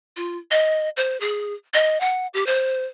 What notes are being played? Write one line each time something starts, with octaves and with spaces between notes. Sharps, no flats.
F4
D#5
C5
G#4
D#5
F#5
G4
C5